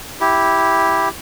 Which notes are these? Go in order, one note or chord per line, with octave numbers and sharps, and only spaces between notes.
E4 G4